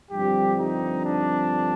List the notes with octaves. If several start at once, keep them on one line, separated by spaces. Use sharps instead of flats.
G2 D3 F3 G3 C4 G4
D#4
D4